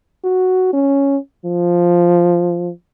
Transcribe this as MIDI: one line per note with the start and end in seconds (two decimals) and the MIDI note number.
0.24 0.69 66
0.73 1.17 61
1.45 2.71 53